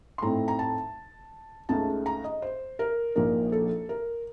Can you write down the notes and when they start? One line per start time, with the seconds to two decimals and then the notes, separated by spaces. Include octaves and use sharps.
0.18 C6
0.22 A2 A3 C4 D#4 A#5
0.48 A#5
0.59 A5
1.69 C#2 C#3 A3 D#4 A5
2.06 A#5
2.24 D#5
2.42 C5
2.79 A#4
3.16 A#1 A#2 F3 A#3 D#4 A#4
3.52 A4
3.89 A#4